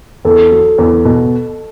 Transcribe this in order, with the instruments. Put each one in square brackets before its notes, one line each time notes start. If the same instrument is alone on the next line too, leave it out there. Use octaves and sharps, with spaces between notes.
[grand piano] E2 [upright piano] A4
[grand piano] F#3
E2
B2